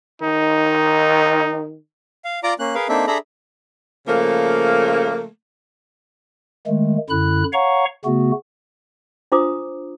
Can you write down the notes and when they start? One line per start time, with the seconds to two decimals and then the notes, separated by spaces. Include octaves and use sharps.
0.22 D#3 D#4
2.25 F5
2.43 F4 D5 A#5 D6
2.59 A#3 C#4 F#6
2.75 G#4 A#4 B4 F5
2.89 A#3 C4 D4 D#4 A4 E5
3.07 D4 G#4 A4 E5 A#5 B5
4.07 C#3 F3 A3 A#3
6.67 D#3 G#3 A3
7.10 F#2 D3 E4 B5 F#6
7.53 C#5 F5 F#5 A#5 C#6
8.05 C#3 A3 B3 F#4
9.32 D4 F4 C5 A#5 D6 D#6